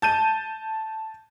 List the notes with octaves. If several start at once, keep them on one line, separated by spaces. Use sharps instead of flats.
A5 G6 D#7